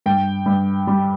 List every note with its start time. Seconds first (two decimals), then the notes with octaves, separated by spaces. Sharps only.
0.06 G2 G5
0.46 G2
0.87 G3